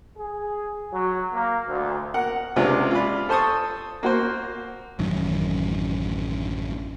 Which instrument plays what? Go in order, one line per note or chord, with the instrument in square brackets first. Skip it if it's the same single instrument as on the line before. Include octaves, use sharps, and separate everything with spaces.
[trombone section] G#4
F#3
A#3
D2
[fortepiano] A#4 F#5
C#2 C3 G#3 D4 F4
F4 G#4 D5 B5
A4 C5 A5 C#6 D#6
A#3 F#4 C5
[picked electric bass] A1 F#2 D#3